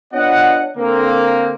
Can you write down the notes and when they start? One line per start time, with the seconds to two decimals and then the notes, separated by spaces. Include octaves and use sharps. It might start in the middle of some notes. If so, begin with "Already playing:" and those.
0.13 B3 D4 F4 C#5 D#5 F#5
0.77 D3 A#3 C4